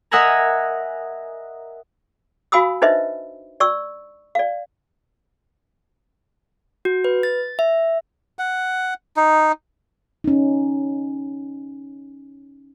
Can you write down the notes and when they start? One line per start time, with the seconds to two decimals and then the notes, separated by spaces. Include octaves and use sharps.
0.11 A#4 D#5 E5 F#5 G#5 A#5
2.52 F#4 F5 G#5 B5 D#6 E6
2.82 D4 D#4 B4 C5 D#5 E5
3.60 D5 C#6 E6
4.35 D5 F5
6.85 F#4
7.04 B4
7.23 A6
7.59 E5
8.39 F#5
9.17 D#4
10.24 C#4 D#4